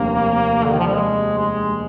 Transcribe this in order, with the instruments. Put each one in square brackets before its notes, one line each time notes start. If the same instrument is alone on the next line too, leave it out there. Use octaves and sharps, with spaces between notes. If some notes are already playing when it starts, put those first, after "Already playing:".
Already playing: [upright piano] F1 D#2 G3 D4 [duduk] A#3
[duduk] D3
D#3
F3
G3
G#3
G#3